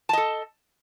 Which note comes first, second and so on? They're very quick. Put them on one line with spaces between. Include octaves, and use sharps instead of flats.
A5 D#5 A4